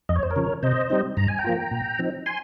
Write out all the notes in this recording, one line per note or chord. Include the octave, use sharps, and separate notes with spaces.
F2 D#5
C#5
C5
A#4 C#5
C#3 F3
C3 C5 D#5
G3 C4 D#4
G2 A#5
G#5
G5 A#5
F3 A#3 F4
A#2
F3 C4 D#4
G#5 C6